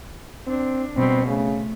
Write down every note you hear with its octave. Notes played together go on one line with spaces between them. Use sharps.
C4 D4
B2 G3 C4
C#3 A3